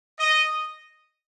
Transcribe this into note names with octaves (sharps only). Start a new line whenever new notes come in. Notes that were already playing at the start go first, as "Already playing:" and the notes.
D#5